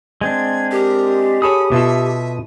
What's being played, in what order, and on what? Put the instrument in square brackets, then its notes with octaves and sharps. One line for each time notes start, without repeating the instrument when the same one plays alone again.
[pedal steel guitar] G#3 C4 D4 [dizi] G#6
[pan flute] G4 [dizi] A#4
[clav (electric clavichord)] G#4 A4 C#5 [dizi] B5 [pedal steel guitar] D#6
[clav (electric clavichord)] B2 F4 A4 [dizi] E5